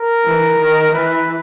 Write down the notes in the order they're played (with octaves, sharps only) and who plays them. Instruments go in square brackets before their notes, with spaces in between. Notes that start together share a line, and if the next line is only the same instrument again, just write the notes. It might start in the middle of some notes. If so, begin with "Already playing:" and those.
Already playing: [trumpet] A#4
[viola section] E3
D#3
[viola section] E3 [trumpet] B4